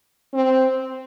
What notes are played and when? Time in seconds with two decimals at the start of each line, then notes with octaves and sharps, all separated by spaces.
0.34 C4